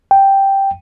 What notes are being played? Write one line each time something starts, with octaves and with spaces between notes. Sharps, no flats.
G5